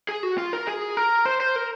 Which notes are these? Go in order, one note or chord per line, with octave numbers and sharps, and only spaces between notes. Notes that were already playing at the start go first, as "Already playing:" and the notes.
G#4
F#4
F4
A#4
G#4
A#4
C5
C5
A#4